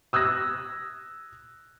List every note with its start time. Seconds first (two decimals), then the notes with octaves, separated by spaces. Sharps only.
0.13 D#6 E6 F#6 G#6 A#6